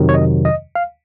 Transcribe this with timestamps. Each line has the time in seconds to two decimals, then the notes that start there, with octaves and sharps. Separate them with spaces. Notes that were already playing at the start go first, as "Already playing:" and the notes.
Already playing: F2 C3 D#3 F#3
0.09 C#5
0.14 D#5
0.45 D#5
0.75 F5